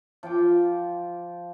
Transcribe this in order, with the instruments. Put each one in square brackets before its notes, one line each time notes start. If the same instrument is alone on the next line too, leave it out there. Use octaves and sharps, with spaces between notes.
[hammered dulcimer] F3 F4 G5 D6